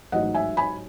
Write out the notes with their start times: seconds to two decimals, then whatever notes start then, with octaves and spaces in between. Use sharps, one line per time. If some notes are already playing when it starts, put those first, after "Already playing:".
0.12 A1 G#2 F#3 D#5 F#5
0.34 E5 G#5
0.57 G#5 B5